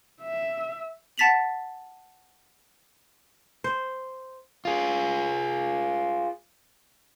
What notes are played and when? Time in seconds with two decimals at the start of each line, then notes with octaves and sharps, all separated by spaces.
0.22 E5
1.18 F#5 A5 A6 B6 F7 F#7
3.64 C5
4.65 F4 G#4